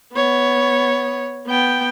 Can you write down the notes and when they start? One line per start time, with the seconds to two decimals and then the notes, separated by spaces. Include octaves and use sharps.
0.14 B3 C#5
1.47 B3 G5